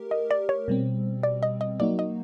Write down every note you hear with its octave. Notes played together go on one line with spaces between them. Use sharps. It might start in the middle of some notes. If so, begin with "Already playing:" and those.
Already playing: A3 G4 A#4
D#5
D5
C#5
B2 G3 C4
D5
D#5
D#5
F#3 A#3 D#4 F#4 D5
D#5